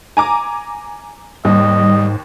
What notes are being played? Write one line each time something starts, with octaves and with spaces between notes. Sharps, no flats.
G#5 A#5 D6
D#2 G#2 G3 D#5